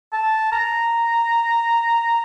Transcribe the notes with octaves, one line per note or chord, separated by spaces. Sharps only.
A5
A#5